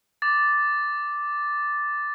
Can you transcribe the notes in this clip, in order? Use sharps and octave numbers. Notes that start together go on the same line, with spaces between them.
D6 A6